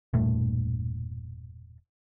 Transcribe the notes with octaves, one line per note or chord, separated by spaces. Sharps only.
E1 G2 A#2 A3